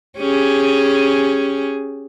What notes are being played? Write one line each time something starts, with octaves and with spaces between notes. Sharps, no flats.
C#4 G4 G#4